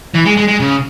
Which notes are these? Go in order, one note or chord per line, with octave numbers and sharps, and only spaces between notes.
E3
G#3
G#3
G#3
C#3